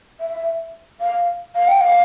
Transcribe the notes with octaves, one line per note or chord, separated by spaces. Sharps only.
E5
F5
F5
G5
F5